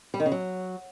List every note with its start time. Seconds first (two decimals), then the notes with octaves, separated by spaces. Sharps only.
0.14 G3
0.20 D#3
0.26 C#3
0.32 F#3